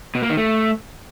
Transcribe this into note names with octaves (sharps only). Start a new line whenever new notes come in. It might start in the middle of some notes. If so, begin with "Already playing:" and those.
B2
A#3
D#3
A3